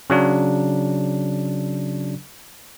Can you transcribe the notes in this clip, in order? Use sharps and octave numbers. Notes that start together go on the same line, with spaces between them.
C#3 F#3 D4